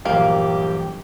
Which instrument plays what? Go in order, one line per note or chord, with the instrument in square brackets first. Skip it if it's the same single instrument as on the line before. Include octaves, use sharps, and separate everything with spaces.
[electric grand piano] A#1 [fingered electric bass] G2 E3 F#3 [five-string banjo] A#3 [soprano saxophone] G4